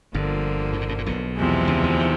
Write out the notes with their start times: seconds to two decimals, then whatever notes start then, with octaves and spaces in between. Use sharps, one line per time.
0.13 G1 G2 D3 F3 A#3
0.73 G2
0.81 G#2
0.89 A2
0.98 A#2
1.06 B1 B2
1.37 E2 C3 F3 G#3
1.68 C#2 C#3
1.84 D2 D3
2.00 D#3